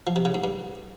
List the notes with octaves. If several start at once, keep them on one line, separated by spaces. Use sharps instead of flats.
F3
C3
C#3
G#2
G2